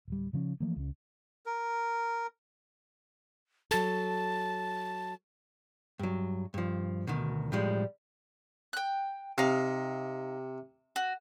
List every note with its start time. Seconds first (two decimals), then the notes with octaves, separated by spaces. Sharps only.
0.08 D1 G3
0.33 C#3 F3 C4 C#4
0.60 E3 F3 A3 A#3
0.76 C#2 C#4
1.46 A#4
3.71 F#3 A4 A5
5.99 G2 F#3
6.54 G2 F3
7.07 D2 B2 D#3
7.52 A2 F3 G3 G#3
8.73 G5 F#6
9.38 C3 D#4 F5
10.96 F#4